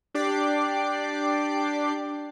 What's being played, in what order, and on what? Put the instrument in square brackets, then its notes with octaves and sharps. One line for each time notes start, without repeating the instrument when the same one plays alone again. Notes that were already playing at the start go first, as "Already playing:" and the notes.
[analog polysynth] D4 G4 D5 G5 D6 C7